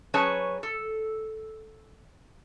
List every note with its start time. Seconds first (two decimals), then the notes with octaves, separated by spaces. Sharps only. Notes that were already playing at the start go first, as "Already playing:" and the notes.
0.14 F#3 C#4 G#4 B4 C#5 A5
0.63 A4